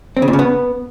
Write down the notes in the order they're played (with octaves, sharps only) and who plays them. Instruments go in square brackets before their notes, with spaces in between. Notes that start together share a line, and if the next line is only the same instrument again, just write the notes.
[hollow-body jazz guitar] C4
C#3
A#2
C#3
B3